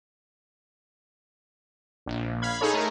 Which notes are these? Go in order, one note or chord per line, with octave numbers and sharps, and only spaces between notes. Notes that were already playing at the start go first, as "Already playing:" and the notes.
A#1
F5 B5 G#6
D#4 G#4 A4 C#5
A3 A#4